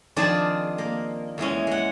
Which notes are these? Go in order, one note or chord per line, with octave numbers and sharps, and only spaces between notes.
D#3 F3 C4 D4 G#4 D5
A#3
E2 E3 G#3 C#4
G#3 F#5